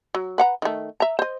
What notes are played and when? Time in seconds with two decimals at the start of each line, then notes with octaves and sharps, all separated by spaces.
0.15 F#3
0.38 B4 F#5 A#5
0.62 D#3 A3
1.00 E5 A#5
1.19 C5 D#5